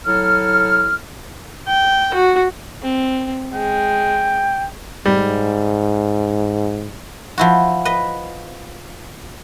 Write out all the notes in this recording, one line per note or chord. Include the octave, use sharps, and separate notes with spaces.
F#3 E4 A4 F6
G5
F#4
C4
G#3 G5
G#2 G3
F3 E4 F#4
B4 D#5